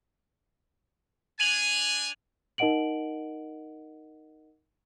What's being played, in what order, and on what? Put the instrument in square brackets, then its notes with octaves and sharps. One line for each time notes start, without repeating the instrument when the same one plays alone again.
[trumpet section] D4 G#5 [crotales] D#7 F7 F#7
[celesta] D#4 A#4 D#5 F#5 D7 F#7